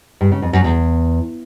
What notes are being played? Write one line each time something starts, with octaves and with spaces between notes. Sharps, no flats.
G2
C#3
F2
F#2
E2